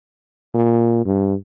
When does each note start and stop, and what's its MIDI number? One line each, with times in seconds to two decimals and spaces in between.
0.54 1.02 46
1.06 1.34 43